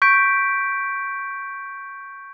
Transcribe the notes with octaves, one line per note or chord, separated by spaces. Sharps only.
C#6 G6 B6 D7